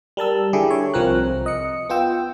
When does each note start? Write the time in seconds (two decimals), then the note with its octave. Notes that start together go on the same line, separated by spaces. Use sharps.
0.17 G3 A#4 A5 E6
0.53 D3 E4 G4 G#4
0.71 C#5
0.94 C2 F3 C4 A#4 F#6
1.46 D#5 C#7
1.89 B3 F4 G5 E6